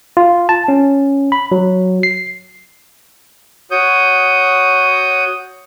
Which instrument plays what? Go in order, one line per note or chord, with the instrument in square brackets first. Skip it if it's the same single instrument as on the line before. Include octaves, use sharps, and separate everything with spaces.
[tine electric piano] F4
A5
C#4
B5
F#3
C7
[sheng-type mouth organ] F#4 C#5 D#6 G6